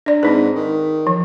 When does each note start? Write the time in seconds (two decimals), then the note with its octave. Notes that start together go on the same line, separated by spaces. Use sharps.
0.06 D4 D5
0.23 G#2 C4 D#4 B4
0.56 D#3
1.07 F3